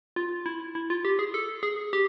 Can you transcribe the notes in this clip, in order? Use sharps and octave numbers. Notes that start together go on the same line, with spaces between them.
F4
E4
E4
F4
G4
G#4
A4
G#4
G4